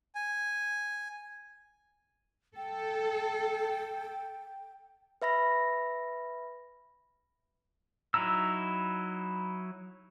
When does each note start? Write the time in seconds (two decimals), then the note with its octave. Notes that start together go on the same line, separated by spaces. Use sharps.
0.15 G#5
2.56 A4 G5
5.22 B4 E5 B5 A#6
8.14 F#3 D#4 E4 A#5 E6